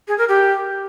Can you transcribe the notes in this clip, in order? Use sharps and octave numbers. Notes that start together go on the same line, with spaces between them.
G#4
A#4
G4